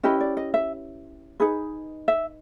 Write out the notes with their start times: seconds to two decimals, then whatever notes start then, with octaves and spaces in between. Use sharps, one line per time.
0.03 C#4 E4 G4 B4 D#5
0.20 D5
0.37 D#5
0.54 E5
1.40 D#4 G#4 B4
2.08 E5